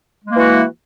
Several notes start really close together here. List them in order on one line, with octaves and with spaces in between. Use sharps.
G#3 A#3 E3 F#4